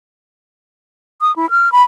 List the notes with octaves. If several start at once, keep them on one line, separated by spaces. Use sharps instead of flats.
D#6
E4
F6
B5